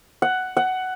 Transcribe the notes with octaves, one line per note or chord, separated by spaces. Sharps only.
F#5
F#5